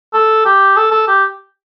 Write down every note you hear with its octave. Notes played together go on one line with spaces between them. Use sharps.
A4
G4
A4
A4
G4